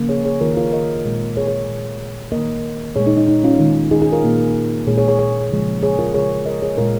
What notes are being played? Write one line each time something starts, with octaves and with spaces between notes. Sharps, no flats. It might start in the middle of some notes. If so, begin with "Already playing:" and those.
Already playing: C#3 F3 A#3
G#4 C#5
G#4 C#5
D#3 A#3 F4 A#4
F4 A#4
A#4 D#5
A#2 G#3
G#4 C#5
G#4 C#5
A#2 G#3
D#3 A#3 A#4 D#5
A#2 G#3 G#4 C#5
D#4 G#4
D#4
D#4
C#4 F4
D#3 G#3
D#4 G#4
D#4 G#4
F4 A#4
A#2 A#3
A#2 G#3 G#4 C#5
G#4 C#5
G#4 C#5
G#4 C#5
C#3 F3 G#3
G#4 C#5
F4 A#4
C#3 G#3 G#4 C#5
A#4 D#5
G#4 C#5
A#2 G#3 F4 A#4